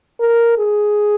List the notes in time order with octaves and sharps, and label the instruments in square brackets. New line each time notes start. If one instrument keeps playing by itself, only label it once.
[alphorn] A#4
G#4